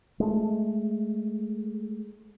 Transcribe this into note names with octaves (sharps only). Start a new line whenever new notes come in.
G#3 A3